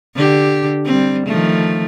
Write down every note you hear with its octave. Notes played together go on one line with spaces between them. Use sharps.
D3 G4
G3 C4
D#3 F3 A3